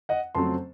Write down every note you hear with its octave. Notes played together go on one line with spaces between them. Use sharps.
D#5 F#5
F2 C#3 F#3 A3 C4 A5 C6